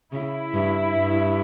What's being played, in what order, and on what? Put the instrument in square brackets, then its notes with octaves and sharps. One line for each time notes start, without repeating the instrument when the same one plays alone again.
[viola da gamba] C#3 [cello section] E4
[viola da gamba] G2
G2